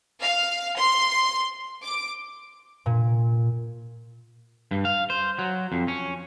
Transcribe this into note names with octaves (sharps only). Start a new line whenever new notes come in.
F5
C6
D6
A#2
G2
F5
C5
F#3
F2
C#4